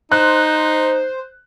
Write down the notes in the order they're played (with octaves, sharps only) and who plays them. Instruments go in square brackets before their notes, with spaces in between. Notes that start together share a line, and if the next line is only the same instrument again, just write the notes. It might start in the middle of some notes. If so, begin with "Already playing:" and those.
[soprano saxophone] D#4 [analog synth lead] C5 [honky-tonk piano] F#6